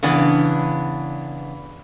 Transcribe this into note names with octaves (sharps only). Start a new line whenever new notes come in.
C#3 E3 B3 D4